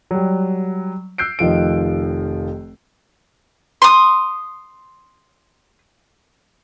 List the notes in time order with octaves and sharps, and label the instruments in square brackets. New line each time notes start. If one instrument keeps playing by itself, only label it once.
[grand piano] F#3 G3
E6 F#6 G6 C7 D7
F1 D#3 F3 D7
[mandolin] C6 D#6